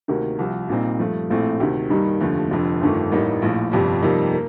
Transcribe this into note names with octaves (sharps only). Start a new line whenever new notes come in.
D2 C3 D#3 A#3
C2 C3 F3
A#1 A#2 G3 C4 D#4
G2 F3 A3
A#1 A2 A3 C4
D2 C3 D#3
G2 D#3 G3 A#3 D#4
F1 D#2 D3 F3 A3
F1 F2 D3
G1 F2 D#3 A3
A1 A2 G3 A#3 D#4
A#1 A2 F3
G1 F2 C3 G3
F2 C3 G3 A#3 D#4
A#3